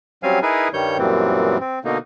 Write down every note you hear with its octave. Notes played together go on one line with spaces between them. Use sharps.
F#3 G3 C4 C#4 F5 G#5
D#4 E4 G#4 A#4 B4 G#5
G2 D#3 G3 C#5 G6
F#2 A#2 E3 G3 C4
C4
B2 D3 A#3 D#4